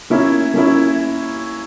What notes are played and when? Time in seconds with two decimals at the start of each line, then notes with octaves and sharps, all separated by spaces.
0.10 A#3 C#4 E4
0.54 A#3 C#4 E4